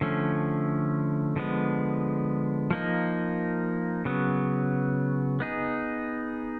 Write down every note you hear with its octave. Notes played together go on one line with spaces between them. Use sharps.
D3 F3 A3 C#4
D3 F3 G#3 B3
F3 A#3 D#4
C#3 F#3 B3
B3 D#4 G#4